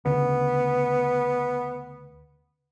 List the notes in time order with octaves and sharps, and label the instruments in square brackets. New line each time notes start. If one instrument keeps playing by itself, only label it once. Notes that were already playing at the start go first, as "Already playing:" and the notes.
[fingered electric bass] D2 C#3 [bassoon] B3